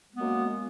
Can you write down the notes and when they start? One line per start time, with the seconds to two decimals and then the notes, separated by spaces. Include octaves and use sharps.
0.12 G#3
0.15 B3
0.18 A#3
0.21 F#2